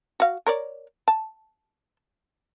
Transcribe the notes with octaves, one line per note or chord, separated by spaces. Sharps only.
F#4 F5
A#4 C#5 D5
A5